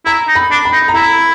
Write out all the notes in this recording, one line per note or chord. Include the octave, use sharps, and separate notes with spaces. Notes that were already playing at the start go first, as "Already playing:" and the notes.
E4 A#5
D#4
B5
D4
B5
D#4
A#5
E4 B5